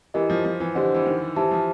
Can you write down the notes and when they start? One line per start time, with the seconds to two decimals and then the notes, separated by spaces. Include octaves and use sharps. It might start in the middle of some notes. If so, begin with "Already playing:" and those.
0.14 E3 E4 G4 A#4 D#5
0.30 F3
0.45 F3
0.60 E3
0.75 D3 D4 G4 C5 D#5 F#5
0.94 E3
1.05 D#3
1.36 E3 G4 C5 E5 A5
1.51 F3